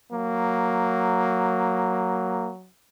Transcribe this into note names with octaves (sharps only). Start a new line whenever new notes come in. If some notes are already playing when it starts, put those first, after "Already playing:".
F#3 A#3